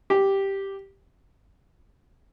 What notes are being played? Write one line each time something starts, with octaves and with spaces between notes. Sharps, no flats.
G4